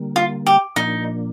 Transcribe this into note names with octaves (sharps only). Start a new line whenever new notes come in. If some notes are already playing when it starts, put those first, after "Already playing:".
Already playing: D3 G3 A#3
F4
G4
A#2 F3 A#3 D4 D#4